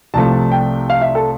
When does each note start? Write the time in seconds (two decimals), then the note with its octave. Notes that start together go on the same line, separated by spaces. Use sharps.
0.14 C2 C3 F3 A3 A5
0.51 G5
0.90 F5
1.01 E5
1.15 A4